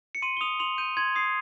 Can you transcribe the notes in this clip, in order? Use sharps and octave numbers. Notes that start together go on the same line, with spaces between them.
C#7
C6 D#7
G7
D#6 F7
C6 F7
G6 D#7
C6 G#6
D#6 C7